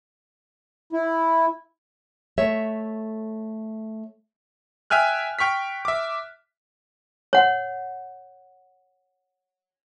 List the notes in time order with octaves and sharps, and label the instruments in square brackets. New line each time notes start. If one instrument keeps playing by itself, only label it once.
[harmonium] E4
[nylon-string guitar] A3 C#5 E5
[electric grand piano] E5 G5 G#5 F6 F#6
G5 C#6 F6 B6
E5 D6
[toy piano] C#5 F#5